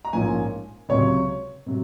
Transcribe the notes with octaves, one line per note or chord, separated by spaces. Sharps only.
A#5
A#1 G#2 F3 A#3 C#4 G#5
C#2 C3 F#3 C#5
C3 F#3